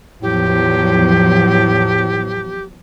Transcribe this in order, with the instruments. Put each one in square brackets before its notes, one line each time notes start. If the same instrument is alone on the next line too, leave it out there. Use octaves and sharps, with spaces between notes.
[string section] E2 F3 F#3 [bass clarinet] A2 [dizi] G4